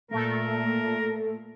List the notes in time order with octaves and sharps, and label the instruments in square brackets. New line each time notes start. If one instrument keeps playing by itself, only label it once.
[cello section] A#2 [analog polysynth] A3 A4 [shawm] A#4